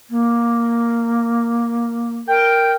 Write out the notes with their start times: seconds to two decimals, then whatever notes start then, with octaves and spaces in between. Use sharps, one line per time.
0.10 A#3
2.28 A#4 G5